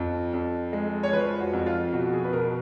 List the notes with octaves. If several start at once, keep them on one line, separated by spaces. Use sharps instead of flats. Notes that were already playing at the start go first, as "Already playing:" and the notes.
Already playing: F2 F3
F2
G#3
C#5
F3 B4
F#4
F2
F4
B2 F#4
G#4
B4
B2 A#4